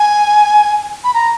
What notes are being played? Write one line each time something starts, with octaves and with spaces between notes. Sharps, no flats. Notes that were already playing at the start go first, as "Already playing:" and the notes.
Already playing: G#5
B5
A#5